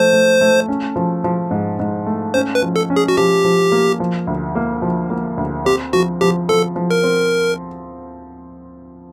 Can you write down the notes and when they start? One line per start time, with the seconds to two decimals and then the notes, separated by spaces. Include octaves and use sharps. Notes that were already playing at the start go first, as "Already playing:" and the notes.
Already playing: F3 A3 C5
0.13 A3
0.41 A3
0.68 C#4
0.96 F3
1.24 F3
1.51 G#2
1.79 G#2
2.06 A3
2.34 C#4 C5
2.55 B4
2.62 F3
2.76 A4
2.90 C#4
2.96 G#4
3.08 F#4
3.17 F3 G4
3.45 F3
3.72 A#3
4.00 F3
4.27 D2
4.55 A#3
4.82 F3
5.10 A#3
5.37 D2
5.65 C4 G4
5.93 F3 F#4
6.21 F3 G4
6.49 F3 A4
6.76 F3
6.91 A#4
7.03 C4